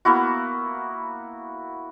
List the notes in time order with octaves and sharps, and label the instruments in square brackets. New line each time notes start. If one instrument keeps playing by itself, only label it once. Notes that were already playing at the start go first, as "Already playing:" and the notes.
[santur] A#3 B3 E4 F#4